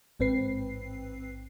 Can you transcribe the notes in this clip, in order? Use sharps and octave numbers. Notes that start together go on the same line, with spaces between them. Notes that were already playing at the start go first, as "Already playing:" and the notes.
A1 G#2 C4 B4 C7